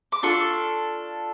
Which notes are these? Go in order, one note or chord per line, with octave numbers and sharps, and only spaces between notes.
D6
D4 F4 A4 C#6